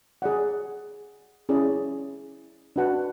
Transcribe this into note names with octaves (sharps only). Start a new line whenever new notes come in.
G#4 D5 F#5
C#4 E4 G#4 D5
D4 F#4 B4 F#5 A5